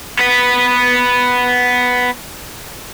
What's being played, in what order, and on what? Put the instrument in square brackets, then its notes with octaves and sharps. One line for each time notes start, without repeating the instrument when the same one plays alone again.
[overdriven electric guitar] B3 B4